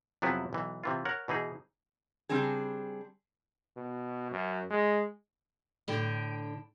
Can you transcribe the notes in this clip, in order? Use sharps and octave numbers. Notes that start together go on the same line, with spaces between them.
F2 C3 F#3 B3 E4 B4
B1 E3
C3 E3 F4
A#4 C#5 F#5
B2 E3 D#4 G#4
C#3 G3 C4 D4 G#4
B2
F#2
G#3
A2 D3 G5